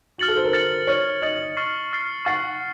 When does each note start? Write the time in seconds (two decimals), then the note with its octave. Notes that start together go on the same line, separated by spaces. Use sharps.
0.18 F#4 F6 A6 C#7 F#7
0.28 A4
0.37 C5
0.44 A#4
0.53 F6 A6 C#7 F#7
0.87 C#5 F6 A6 C#7 F#7
1.22 D#5 F6 A6 C#7 F#7
1.57 C#6 F6 A6 C7
1.91 C#6 F6 A6 C7
2.25 F#5 C#6 F6 A6 C7